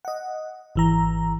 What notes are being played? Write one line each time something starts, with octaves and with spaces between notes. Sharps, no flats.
D#5 F#5
G#1 E3 A#5